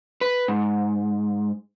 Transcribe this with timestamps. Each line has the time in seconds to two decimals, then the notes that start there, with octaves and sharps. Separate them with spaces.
0.21 B4
0.48 G#2